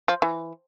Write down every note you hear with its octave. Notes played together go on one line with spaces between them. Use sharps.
F3
E3